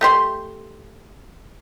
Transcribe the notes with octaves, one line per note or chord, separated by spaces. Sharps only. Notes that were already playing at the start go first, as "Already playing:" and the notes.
A3 G4 C6